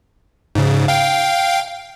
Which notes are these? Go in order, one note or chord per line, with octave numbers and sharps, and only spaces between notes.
G#2 C#3
F5 G5